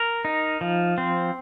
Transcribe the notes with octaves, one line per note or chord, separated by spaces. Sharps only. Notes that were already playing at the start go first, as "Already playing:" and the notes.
Already playing: A#4
D#4
F3
C4